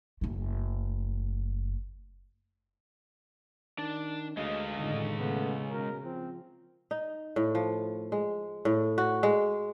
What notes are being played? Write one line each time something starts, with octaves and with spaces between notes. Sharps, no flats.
F#1 A3
D#3 D4
D2 G#3 G#4 D#5 F5
F1 A2 D3 D#3 D#5
C#3 A3 B3
B2 A#4
F3 C4
D#4
A2
F3
G#3
A2
F#4
G#3